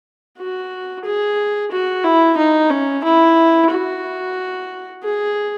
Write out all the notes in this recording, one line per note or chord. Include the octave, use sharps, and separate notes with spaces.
F#4
G#4
F#4
E4
D#4
C#4
E4
F#4
G#4